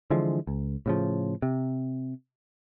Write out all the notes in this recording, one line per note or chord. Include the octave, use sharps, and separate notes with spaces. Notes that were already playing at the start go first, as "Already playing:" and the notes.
D3 E3 F3 G#3
C#2
A2 C#3 F3
C3